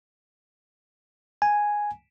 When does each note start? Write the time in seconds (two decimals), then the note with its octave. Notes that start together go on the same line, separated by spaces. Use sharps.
1.42 G#5